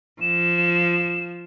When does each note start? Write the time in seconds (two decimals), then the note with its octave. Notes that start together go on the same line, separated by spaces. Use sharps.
0.21 F3 E7